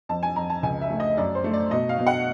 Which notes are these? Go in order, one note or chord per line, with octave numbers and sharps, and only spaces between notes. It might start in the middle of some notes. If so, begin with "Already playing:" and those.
F2 A5
G#5
F2 A#5
A5
C#2 G#5
E5
A3
D#5
F#2 D5
C5
A3
D5
B2 D#5
F5
B2
F#5